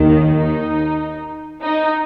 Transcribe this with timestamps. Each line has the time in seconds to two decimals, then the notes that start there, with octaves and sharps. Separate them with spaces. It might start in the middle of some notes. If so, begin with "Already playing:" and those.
Already playing: D#2 D#3
0.25 D#4
1.64 D#4